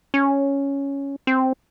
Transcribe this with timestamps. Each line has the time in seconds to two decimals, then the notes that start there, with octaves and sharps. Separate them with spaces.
0.14 C#4
1.27 C4